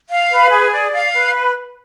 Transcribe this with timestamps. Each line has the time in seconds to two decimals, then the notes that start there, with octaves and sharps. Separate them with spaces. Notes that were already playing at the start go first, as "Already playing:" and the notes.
0.09 F5
0.30 B4
0.50 G#4
0.71 D5
0.93 F5
1.14 B4